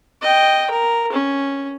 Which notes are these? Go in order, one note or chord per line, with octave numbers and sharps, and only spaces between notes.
D#5 G5
A#4
C#4